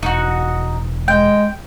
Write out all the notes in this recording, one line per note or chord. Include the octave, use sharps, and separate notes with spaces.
E1 D#4 F#4
G#3 G5